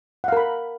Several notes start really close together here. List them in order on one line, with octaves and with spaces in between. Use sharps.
F#5 F5 A#4 B5